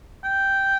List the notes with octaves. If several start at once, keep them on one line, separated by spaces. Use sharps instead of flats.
G5